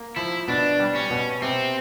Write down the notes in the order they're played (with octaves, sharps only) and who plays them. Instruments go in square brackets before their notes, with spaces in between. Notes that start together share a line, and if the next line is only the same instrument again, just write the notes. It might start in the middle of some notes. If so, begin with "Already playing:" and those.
Already playing: [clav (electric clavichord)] A#3
[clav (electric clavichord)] F3 [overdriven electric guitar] E4
[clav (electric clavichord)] B2 [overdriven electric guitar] D4
[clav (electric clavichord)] G3
[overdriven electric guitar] C#4
[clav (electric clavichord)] B2
[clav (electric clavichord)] C3 [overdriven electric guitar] C4